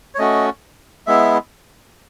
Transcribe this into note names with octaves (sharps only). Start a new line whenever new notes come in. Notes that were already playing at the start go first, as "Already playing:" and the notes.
C#5
A3 C#4 F#4 D#5
G#3 B3 E4 E5